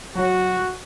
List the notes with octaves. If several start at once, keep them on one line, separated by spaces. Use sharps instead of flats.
F#3 F#4